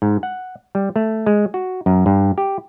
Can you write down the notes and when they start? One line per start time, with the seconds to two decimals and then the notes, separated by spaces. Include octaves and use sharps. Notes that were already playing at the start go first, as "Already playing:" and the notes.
0.02 G#2
0.23 F#5
0.75 G3
0.96 A3
1.26 G#3
1.54 F#4
1.86 F#2
2.06 G2
2.38 G4